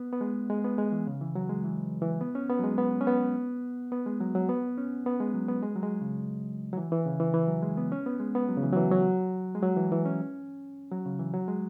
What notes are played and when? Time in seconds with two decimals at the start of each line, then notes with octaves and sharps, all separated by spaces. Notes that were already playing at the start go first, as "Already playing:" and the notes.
Already playing: B3
0.13 B3
0.21 G#3
0.50 G#3
0.64 B3
0.78 G#3
0.92 E3
1.07 C#3
1.21 E3
1.35 F#3
1.50 G#3
1.64 E3
2.02 E3
2.21 B3
2.35 C#4
2.50 B3
2.59 F#3
2.64 G#3
2.78 B3
3.01 C#4
3.07 B3
3.92 B3
4.06 G#3
4.20 F#3
4.35 F#3
4.49 B3
4.78 C#4
5.06 B3
5.20 G#3
5.34 F#3
5.48 B3
5.63 G#3
5.76 F#3
5.83 G#3
6.01 C#3
6.73 F#3
6.77 E3
6.92 E3
7.06 C#3
7.20 E3
7.34 E3
7.48 F#3
7.62 G#3
7.77 B3
7.92 C#4
8.06 B3
8.20 G#3
8.35 B3
8.49 F#3
8.57 C#3
8.63 E3
8.72 F#3
8.77 E3
8.91 F#3
9.55 G#3
9.62 F#3
9.77 E3
9.92 E3
10.05 C#4
10.92 F#3
11.06 C#3
11.19 E3
11.34 F#3
11.48 G#3